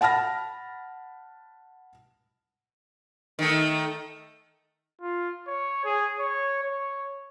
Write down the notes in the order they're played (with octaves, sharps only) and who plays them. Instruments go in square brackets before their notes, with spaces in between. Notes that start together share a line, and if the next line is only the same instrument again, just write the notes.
[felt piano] F#5 A5 B5 F6 A#6
[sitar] D#3 A3
[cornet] F4
C#5
G#4
C#5
C#5